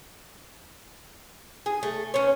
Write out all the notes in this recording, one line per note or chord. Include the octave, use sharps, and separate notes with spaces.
G#4
A3
C#4 C#5